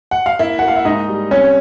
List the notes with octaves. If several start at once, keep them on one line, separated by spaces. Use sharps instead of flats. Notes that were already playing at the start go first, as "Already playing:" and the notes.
F#5
F5
A#3 E4 E5
A#3 F#5
F5
E5
G#2 D#4 D#5
G3
C2 C#4 C#5